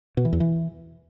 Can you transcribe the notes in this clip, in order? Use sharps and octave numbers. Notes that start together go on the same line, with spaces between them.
B2
E3
E2
E3